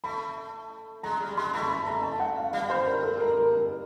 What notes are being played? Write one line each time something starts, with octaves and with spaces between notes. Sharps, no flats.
A3 B5
G#3 A#5
G3
G#3 C6
A3 B5
B5
A#5
A5
F#5
F5
G3 F5
C5
A#4
A4
A#4
A#4
A#4